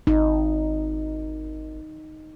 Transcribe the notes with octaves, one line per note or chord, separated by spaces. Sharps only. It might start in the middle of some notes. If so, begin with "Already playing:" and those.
G#1 D#4